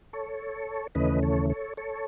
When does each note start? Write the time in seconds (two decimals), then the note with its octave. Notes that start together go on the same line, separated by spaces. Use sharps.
0.13 A4 C#5
0.95 D#2 C#3 E3 A3 C#4 B4 D#5
1.23 A4 C#5
1.50 A4 C#5
1.77 A4 C#5